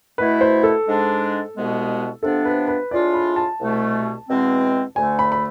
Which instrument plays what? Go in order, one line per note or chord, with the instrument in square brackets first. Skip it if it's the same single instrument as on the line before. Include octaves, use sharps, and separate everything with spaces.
[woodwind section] B2 A3 E4 [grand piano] B4
[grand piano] C5
A4
[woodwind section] G#2 G#3 D4
C2 B2 G#3 B3
[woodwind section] C3 F3 B3 D4 [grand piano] A4
[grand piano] B4
B4
[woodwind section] A2 G#3 D4 F4 [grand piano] D5
[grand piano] B5
A5
[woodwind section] C2 B2 A3
E2 B2 G#3 C4
[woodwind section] D2 D3 A3 [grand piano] G#5
[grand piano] B5
B5